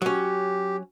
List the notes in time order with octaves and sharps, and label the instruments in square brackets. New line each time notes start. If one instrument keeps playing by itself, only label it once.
[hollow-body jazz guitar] F#3 C#4 [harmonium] G4